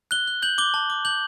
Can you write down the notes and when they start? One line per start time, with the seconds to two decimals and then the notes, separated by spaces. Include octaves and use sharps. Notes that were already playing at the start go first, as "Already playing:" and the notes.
0.11 F#6 G7
0.27 F#6
0.42 G6 F#7
0.58 D6 G7
0.74 A5
0.90 D6
1.05 G6 F#7